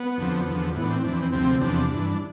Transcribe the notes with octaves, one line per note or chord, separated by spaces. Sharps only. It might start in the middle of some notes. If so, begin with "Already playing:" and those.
Already playing: B3
F2 D3 F3
E2 D3 F3
A2 E3 B3
D4
C4
F2 D4
E3 C4
C4
D2 C3 F3 C4
E2 C3 F3 D4
G2 E3
D4